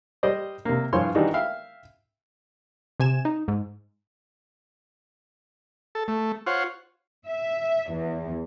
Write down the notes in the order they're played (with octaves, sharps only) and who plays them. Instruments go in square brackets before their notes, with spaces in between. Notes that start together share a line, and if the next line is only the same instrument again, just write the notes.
[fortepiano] G3 C5 D5 D#5
C3 A#3
G2 E3 F3 C5 C#5 C6
D#3 E3 G3 D4 D#4 F#4
E5 F5 G5
[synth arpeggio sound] C3 G#5 E7
D#4
G#2
[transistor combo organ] A4
A3
F4 C5 C#5 F#5
[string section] E5
E2